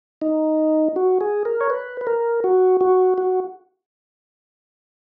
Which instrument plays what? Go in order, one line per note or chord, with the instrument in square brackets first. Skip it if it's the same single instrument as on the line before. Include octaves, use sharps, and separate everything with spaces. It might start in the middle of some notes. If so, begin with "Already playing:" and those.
[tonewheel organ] D#4
F#4
G#4
A#4
C#5
B4
B4
A#4
F#4
F#4
F#4